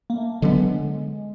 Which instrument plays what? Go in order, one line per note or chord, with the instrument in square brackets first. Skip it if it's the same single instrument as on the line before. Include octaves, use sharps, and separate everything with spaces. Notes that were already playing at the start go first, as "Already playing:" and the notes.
[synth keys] A#3
A3
[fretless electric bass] D3 F#3 B3 D4 [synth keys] G#3